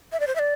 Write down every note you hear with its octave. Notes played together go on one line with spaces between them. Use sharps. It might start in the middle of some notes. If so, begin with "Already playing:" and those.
E5
D5
C5
E5
D5